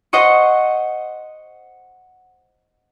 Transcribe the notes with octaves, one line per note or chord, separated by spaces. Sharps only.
C5 D#5 F#5 C#6